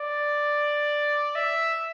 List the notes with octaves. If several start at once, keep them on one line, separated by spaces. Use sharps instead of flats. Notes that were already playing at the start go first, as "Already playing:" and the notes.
Already playing: D5
E5